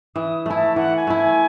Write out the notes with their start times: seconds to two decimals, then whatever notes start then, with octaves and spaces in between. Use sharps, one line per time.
0.16 E3 D#6
0.46 A3 E4 G#5
0.56 A5
0.76 E3 F#5
0.96 G#5
1.07 A3 E4
1.16 G#5